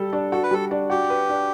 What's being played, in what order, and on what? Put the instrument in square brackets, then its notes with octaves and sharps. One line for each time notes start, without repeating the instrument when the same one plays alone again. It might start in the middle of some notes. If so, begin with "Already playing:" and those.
Already playing: [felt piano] G3 A4
D4
[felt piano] F#4 [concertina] A4
[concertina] B4
[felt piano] G3 [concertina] A4
[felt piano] D4
[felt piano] F#4 [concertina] G4
[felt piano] B4
D4